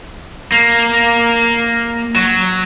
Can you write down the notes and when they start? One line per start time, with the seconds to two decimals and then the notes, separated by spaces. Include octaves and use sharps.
0.52 A#3
2.16 F#3